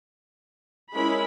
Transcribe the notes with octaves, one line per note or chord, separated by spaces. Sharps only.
G#3 C#4 E4 A#4 B5